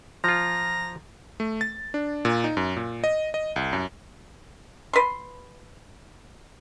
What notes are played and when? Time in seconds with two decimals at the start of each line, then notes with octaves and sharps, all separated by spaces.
0.24 F3 F4 A#5
1.40 A3
1.61 A6
1.94 D4
2.25 A#2
2.44 D#4
2.57 F#2
2.77 A#2
3.04 D#5
3.34 D#5
3.56 C2
3.73 F#2
4.93 B4 C6